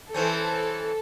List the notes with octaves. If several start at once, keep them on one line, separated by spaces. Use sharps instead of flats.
E3 C4 C#4 A4